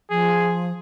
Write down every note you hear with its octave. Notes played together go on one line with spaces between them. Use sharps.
F3 G#4